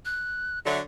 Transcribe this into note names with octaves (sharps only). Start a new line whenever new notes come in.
F#6
D3 F#3 E5